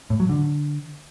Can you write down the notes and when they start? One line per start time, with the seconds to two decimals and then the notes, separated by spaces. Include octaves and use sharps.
0.10 A2
0.20 F#3
0.29 D3